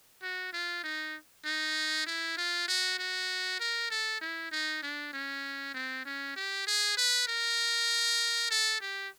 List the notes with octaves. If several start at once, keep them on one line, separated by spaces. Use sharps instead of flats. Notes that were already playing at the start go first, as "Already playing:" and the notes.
F#4
F4
D#4
D#4
E4
F4
F#4
F#4
A#4
A4
E4
D#4
D4
C#4
C4
C#4
G4
G#4
B4
A#4
A4
G4